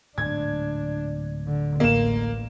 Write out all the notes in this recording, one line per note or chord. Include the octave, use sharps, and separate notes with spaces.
D1 G#2 D4 G#6
D3
A1 A#3 E7